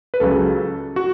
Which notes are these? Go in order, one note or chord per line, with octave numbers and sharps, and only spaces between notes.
B4
C#2 C#3 F#3 A4
F#4